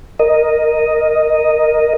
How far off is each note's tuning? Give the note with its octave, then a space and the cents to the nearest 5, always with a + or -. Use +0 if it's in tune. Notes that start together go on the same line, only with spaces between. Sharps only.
A#4 +0 D#5 +0